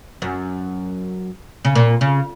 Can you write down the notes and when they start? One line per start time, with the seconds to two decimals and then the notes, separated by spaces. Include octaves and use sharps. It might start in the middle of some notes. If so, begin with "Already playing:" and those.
0.22 F#2
1.65 C#3
1.75 A#2
2.01 C#3